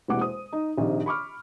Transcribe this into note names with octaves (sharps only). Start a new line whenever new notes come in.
E1 C3 A#3 E4 F#5 D6
C5 D#6
D#4
A#1 C3 D#3
B5 C#6 D6 F6